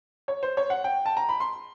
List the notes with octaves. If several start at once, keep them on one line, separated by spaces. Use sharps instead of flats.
C#5
C5
C#5
F#5
G5
A5
A#5
B5
C6